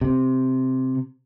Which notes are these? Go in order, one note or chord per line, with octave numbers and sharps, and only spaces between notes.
C3